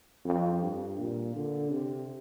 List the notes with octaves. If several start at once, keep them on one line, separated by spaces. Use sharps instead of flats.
F2
G2
A#2
D3
C3